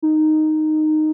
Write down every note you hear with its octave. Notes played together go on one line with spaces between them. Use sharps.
D#4